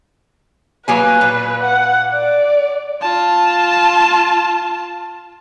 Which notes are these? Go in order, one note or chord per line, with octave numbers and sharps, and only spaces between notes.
F#3 A#3 B4 G#5
A#2
F#5
D5
F4 A5